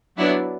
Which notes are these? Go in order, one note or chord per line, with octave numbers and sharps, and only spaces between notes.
F#3 B3 D4 E4